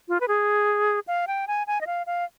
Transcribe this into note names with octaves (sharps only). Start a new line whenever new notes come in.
F4
B4
G#4
F5
G5
G#5
G#5
D#5
F5
F5